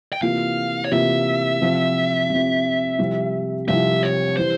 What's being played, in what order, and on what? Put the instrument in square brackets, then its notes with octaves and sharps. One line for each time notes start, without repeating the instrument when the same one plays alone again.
[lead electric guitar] G5
[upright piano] C3 E3 A#3 F4 [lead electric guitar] F5
[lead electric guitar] C#5
[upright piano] C3 E3 A#3 F4 [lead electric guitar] E5
[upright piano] C3 F3 C4
C3 F3 C4
C2 C3 F3 C4
[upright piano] C2 C3 F3 C4 [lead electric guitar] E5
[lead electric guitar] C#5
[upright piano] E3 G3 [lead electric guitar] C5